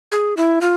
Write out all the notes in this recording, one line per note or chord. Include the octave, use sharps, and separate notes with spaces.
G#4
E4
F4